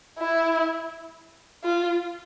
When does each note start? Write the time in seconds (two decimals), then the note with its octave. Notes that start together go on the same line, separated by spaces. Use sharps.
0.19 E4
1.64 F4